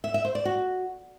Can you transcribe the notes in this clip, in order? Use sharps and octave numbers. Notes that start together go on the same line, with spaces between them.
E5
E5
C5
D5
F#4